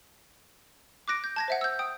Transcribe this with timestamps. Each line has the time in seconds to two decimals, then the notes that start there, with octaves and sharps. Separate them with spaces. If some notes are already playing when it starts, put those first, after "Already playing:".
1.08 D6 F#6 A#6 D7
1.24 G6
1.36 A5 G#6 A#6
1.48 C5 E5 F#5
1.61 E6 G6
1.79 G5 D#6